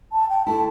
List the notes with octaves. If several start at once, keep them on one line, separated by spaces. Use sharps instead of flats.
A5
G5
D3 A3 E4 A5